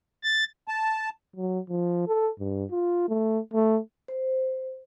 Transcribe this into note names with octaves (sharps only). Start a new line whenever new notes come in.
A6
A5
F#3
F3
A4
G2
F4
A3
A3
C5